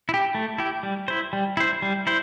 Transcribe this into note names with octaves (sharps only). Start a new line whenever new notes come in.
E4
G4
A3
E4 G4
G3
E4 C5
G3
E4 C5
G3
E4 C5